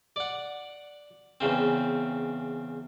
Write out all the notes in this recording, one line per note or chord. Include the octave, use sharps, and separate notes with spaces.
D5 F#5
E2 C#3 C4